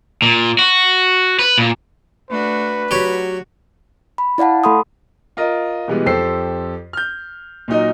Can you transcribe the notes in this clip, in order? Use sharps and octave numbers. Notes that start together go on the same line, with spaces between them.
A#2
F#4
B4
A#2
A3 D4 F#4 B4
F#3 F#4 G4 C#5
B5
E4 D5 F5 F#5 A5
A3 A4 B5 C6 D#6
F4 A#4 D#5
B2 E3 G3 G#3 B3
F2 G4 A4 C5 E6 C7
F6 G6
A#2 F#3 D#4 D#5